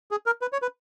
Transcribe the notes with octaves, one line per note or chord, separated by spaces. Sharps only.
G#4
A#4
B4
C#5
B4